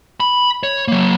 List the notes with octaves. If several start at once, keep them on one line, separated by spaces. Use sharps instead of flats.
B5
C#5
F#3 A#3